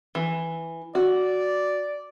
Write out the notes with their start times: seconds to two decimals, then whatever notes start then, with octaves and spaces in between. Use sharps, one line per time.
0.15 E3
0.95 F#4 D5